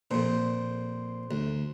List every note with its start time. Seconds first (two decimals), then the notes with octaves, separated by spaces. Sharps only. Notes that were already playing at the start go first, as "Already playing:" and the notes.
0.11 F2 A#2 C5
1.31 D2